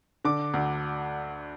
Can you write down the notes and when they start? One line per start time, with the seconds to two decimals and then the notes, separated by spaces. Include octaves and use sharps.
0.24 D3 D6
0.54 D2